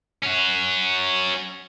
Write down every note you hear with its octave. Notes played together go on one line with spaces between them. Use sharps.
C#4 F#4